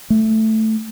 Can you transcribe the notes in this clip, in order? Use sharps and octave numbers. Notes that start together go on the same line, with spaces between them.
A3